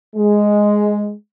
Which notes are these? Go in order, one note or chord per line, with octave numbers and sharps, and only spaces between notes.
G#3